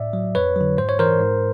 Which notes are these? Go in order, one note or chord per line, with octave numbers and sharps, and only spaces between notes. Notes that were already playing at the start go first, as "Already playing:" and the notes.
Already playing: A2 D5 E5
F#3
F2 B4 C#5
D3 F#3
G#2 C5
C#5
E3 A#4 C5
G#2